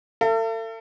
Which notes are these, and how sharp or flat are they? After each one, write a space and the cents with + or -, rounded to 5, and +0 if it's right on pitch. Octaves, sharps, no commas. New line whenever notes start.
A4 +35 E5 +45